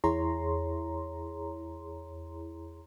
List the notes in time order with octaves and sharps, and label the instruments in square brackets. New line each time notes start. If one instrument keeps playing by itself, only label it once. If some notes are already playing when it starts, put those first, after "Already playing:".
[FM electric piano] E2 E4 G#4 C#5 A#5 C6